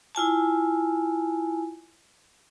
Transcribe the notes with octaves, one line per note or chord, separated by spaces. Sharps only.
E4 F4 G#5 A5